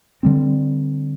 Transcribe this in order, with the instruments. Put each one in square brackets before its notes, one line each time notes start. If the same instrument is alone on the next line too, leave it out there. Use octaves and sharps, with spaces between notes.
[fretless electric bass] D3 G3 C4